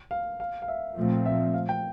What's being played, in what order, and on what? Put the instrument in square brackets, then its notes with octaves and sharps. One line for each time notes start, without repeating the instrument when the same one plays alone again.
[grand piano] F5
F5
F5
E5
[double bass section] A#2 F3 A3 C4
[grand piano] E5
F5
G5